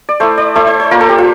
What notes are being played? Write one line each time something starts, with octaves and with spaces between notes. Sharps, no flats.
D5
A3 E4 C5
D5
A3 E4 C5
C5
C5
A#3 F4 A#4
A4
G4
F4